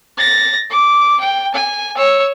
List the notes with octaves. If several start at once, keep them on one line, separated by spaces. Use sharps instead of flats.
A6 A#6
D6
G5
G#5
C#5 E6